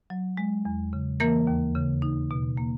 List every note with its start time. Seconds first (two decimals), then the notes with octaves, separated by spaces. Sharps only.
0.10 F#3
0.37 G#3
0.65 E2
0.93 C#3
1.20 E3 A#3 A#4
1.47 D#2
1.75 C#3
2.02 D#4
2.31 B2
2.57 A#3